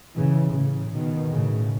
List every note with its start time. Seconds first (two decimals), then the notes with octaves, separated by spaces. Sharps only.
0.14 C#3 E3
0.53 A2 C#3
0.92 B2 D#3
1.31 A2 C#3